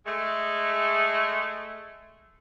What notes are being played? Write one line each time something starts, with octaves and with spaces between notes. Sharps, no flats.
G#3 A3